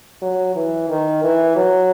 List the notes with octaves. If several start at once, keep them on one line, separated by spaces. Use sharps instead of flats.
F#3
E3
D#3
E3
F#3